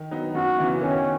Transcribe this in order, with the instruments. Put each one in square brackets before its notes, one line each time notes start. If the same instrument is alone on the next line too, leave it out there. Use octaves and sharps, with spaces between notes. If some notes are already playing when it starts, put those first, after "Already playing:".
Already playing: [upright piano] D#3
F#3 B3 D#4
[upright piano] F#2 [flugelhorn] F#4
[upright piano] C#3 E3 B3 E4
[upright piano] D#3 [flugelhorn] C#4